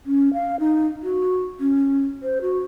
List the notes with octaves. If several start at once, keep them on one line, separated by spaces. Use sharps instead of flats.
C#4
F5
D#4
F#4
C#4
C5
F#4